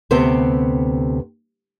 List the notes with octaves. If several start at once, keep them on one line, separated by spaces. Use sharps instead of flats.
D2 C3 B3 C4 C5 G5